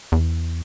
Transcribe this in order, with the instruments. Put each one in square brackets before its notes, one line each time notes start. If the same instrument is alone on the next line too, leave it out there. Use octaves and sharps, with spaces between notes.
[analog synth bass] E2